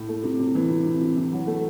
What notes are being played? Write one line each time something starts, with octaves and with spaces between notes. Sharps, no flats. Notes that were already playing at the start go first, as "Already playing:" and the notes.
Already playing: A2
A3
C3
C3
E3
C3
C3
C3
E3
F#3
A3